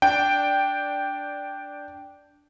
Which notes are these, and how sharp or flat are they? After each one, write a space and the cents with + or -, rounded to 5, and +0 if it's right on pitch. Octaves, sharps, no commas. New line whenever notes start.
D4 -5 G5 +0